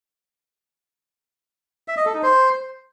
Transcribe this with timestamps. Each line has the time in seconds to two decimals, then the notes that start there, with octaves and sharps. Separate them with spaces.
1.88 E5
1.97 D#5
2.06 A4
2.14 D#4
2.23 C5